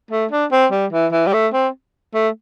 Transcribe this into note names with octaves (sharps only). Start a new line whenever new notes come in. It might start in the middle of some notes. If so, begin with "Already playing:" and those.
A3
D4
C4
G3
E3
E3
G3
A3
C4
A3